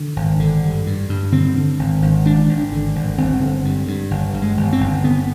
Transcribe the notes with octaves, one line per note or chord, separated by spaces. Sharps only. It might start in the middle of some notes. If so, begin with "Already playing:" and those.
Already playing: D3
G#1
D3
G2
G2
G2
D3 C4
D3
G#1
G#1
G#1 D4
G#1
D3
G#1
G1 C4
D3
G2
G2
G1
G2
G#3
G1
C4
G1
D3 B3